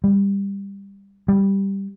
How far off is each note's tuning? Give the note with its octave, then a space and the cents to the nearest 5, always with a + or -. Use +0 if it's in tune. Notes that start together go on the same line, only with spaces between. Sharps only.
G3 +15
G3 +0